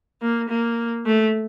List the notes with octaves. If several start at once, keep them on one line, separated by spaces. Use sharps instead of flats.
A#3
A#3
A3